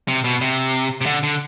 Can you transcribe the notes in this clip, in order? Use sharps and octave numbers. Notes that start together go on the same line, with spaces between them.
C3
B2
C3
C3
D3
D3